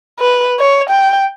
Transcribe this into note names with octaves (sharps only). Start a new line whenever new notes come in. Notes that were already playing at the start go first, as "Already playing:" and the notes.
B4
C#5
G5